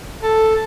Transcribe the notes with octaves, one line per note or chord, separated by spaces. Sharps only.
A4